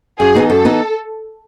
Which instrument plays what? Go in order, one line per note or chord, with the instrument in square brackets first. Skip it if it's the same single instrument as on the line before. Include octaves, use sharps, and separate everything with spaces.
[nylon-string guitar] F#2 [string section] G#4
[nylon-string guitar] E3 B3 D#4
[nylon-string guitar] F#2 [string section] A4
[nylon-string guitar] E3 B3 D#4